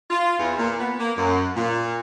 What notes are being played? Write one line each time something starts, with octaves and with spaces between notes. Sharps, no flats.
F4
E2
A#2
B3
A#3
F#2
A#2